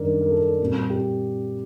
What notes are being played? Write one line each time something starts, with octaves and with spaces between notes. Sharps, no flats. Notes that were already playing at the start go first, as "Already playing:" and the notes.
Already playing: F#2 D#3 G3 D4 A#4 D5
A#4
A4
A#2 G3 C4
G4